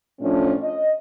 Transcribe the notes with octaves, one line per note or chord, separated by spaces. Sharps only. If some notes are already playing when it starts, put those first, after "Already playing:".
A2 F3 A3 C#4 D4
D#5